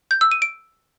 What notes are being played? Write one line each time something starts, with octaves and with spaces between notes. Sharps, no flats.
G6
E6
D#7
D7